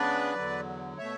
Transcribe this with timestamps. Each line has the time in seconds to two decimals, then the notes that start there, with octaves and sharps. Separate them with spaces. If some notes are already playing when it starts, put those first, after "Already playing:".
Already playing: C#3 G#3 B3 D4 B4 D5
0.35 E2 D3 F#3
0.98 B2 A3 C#5 E5